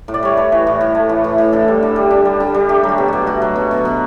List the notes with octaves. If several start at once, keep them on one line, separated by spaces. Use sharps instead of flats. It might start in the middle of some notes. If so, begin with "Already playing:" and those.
A2
D5
G3 C#5
A3 B4
E3
A2
A2
A3
E3
A2
A2
D3 A4
G3
D3
G3
D3
G3
D3
G3
A3 G4
F#3
F#4
B2
B2 G4
A3 F#4
F#3
B2
B2
B2